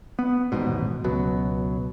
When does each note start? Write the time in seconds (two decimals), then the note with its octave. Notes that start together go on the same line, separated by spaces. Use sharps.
0.19 B3
0.52 D#1 A1 G#2 B2
1.04 C#2 B2 F#3